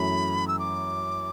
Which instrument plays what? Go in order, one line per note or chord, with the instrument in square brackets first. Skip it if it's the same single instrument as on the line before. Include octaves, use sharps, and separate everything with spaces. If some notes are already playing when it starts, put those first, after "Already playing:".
Already playing: [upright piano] F#2 E3 A3 E4 [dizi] B5
[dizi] E6
D6